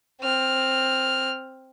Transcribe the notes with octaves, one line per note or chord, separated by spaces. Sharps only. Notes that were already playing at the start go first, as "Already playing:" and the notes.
C4 F6